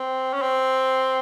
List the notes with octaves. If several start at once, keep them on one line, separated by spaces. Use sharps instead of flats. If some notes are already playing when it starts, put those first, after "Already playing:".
Already playing: C4
C#4
C4